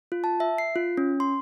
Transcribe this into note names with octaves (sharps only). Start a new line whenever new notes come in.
F4
A5
E5
C7
F4
C#4
C6